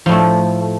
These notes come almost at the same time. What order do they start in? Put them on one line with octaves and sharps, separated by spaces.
F3 A2 A3